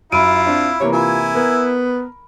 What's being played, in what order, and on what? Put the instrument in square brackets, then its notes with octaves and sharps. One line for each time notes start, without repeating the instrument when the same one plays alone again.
[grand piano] F#2 D#7 [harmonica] E4 F4 [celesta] B5 D7
[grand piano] C4 [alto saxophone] D4
[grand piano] C3 E3 A#3 [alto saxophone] C#5
[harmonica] E4 G#5 [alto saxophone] F4
[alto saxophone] B3 [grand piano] A#4